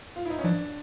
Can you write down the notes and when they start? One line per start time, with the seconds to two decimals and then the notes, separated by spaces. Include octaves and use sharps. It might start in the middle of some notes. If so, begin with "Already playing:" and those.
0.16 F4
0.26 E4
0.30 D#4
0.39 C#4
0.44 F3 D4